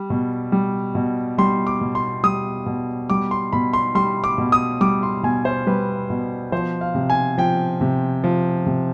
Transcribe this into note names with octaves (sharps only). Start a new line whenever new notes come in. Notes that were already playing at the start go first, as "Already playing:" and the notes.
Already playing: G3
B2
G3
B2
G3 C6
D6
B2
C6
G3 D#6
B2
G3 D6
C6
B2 B5
C6
G3 C6
D6
B2
D#6
G3 D6
C6
B2 G#5
C5
G3 B4
B2
F3 C5
F5
C3
G#5
F3 G5
C3
F3
C3